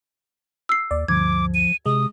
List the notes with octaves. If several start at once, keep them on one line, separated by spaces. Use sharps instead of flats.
E6 C7
D#2 D5
D2 G2 F3 D6 G#6
D#7
C3 G#3 D#6